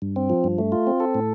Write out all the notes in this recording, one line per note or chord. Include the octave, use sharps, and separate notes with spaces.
G2
C4
F3
G2
A3
F4
C4
A4
A2